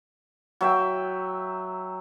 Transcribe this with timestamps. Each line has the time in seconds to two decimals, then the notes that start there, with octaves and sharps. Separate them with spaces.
0.61 F#3 E5 G5